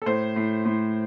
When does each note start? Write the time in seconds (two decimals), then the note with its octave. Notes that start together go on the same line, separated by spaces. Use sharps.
0.02 A4
0.06 A2 C5
0.36 A2
0.65 A2